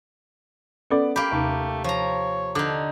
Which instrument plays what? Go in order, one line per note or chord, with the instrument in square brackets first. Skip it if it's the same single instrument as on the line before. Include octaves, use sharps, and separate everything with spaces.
[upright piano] B3 D5 [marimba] C#4 A4
[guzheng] A#3 G4 [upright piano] B5
[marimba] D#2 C3 D#4 [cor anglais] A3
[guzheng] F3 A#5 [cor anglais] C#5
[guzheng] D3 D#4 [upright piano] D6